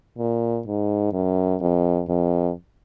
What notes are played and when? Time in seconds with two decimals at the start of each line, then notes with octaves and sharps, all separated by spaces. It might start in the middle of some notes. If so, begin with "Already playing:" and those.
0.18 A#2
0.66 G#2
1.13 F#2
1.60 F2
2.08 F2